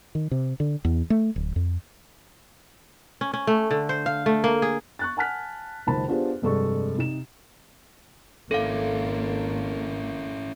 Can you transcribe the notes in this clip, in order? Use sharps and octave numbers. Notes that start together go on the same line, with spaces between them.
D#3
C3
D3
E2
A3
D1
F2
C#4
C#4
A3
D3
C5
F5
A3
A#3
G#4
C#6 F#6 A6
F#5 G#5 A5 F6 F#6 B6
F#1 C#2 D#3 C5 A5 B5
B3 D4 F4 G4 G#4 C5
F1 G2 G#3 A4 C#6
C3 D#4 E7
G#1 A#3 C#4 E4 A4 F5